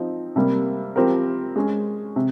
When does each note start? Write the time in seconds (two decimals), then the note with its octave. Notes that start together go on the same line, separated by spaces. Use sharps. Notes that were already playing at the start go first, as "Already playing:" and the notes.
Already playing: F3 C4 D#4
0.36 C3 G3 A#3
0.96 F3 C4 G4 A#4
1.56 G#3 C#4 G#4
2.16 C3